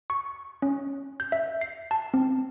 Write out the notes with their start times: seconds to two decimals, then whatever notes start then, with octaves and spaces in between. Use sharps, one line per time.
0.10 C#6
0.62 C#4
1.20 G6
1.32 E5
1.61 C7
1.91 A5
2.14 C4